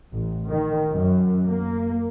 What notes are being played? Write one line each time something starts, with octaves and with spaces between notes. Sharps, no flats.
A1
D#3
F#2
A#3